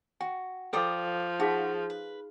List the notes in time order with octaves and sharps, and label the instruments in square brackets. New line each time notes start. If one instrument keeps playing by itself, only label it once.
[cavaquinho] F#4 [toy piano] G5
[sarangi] F3 [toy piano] A4 [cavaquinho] D5 G5 D#6
[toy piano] D#4 G#4 F5 [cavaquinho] F#4
[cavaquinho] B4